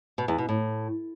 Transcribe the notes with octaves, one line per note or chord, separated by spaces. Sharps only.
B2
E2
B2
A2